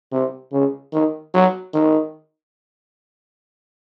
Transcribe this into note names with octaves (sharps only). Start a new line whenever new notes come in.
C3
C#3
D#3
F#3
D#3